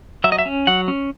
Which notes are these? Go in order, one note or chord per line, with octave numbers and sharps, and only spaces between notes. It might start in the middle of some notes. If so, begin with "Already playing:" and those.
F#3 E5
D#5
E5
C#4
F#3 F#5
C#4